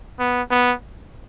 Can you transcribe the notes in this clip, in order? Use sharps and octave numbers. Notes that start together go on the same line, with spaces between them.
B3
B3